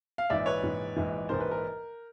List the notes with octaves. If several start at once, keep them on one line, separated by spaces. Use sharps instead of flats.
F5
A#1 G#2 E3 D5 E5
B4 C#5
A#1 G#2 E3
A#1 G#2 E3
A#1 G#2 E3 A#4 C5
B4
A#4